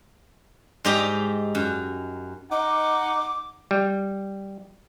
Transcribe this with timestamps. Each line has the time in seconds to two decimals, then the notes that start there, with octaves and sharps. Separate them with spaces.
0.85 G#2 G#3 D#4 G4 A#5
1.55 F#2
2.51 D#4 D#5 F#5 D6
3.71 G3